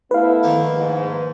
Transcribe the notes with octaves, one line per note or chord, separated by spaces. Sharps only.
A3 B3 E4 B4 F5
D#3 F3 A#3
G#2